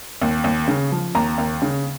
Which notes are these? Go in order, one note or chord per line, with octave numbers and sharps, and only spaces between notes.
D#2
D#2
C#3
F3
D#2 A#5
D#2
C#3